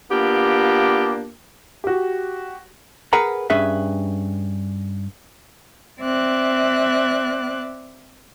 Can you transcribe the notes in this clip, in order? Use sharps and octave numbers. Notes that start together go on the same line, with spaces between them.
A#3 B3 D4 F4 G4
F#4 G4
G#4 A#4 B4 F#5 A#5
G2 C#4 G#4 B4 E5
C4 D5 E5 F#6